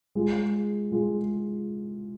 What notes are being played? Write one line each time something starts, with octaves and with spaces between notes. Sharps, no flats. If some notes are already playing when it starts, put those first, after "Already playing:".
G#3 F4 G#4
G#3 F4 G#4